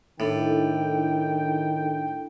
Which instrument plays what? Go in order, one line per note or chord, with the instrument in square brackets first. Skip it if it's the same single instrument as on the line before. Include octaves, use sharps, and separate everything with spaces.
[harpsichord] A2 [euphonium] D#3 [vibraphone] D4 E4 A4 [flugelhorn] G5